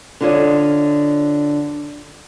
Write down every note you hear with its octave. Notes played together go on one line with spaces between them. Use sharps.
D3 F4 C#5 D#5